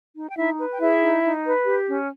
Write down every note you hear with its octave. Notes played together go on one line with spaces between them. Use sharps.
D#4
G5
D#4 E4 E5
B4
G5
E4 G#4 E5
D#4
D#4
B4
G4
C#4